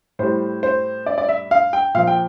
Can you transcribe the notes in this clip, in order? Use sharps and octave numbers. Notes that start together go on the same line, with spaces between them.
A2 G3 C5
C5
D5
D5
E5
F5
G5
A#2 F3 F5
G5